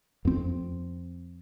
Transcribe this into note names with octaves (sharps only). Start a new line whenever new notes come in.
F2 C4